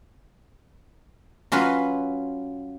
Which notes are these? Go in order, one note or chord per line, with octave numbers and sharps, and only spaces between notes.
F#3 C#4 F4 B4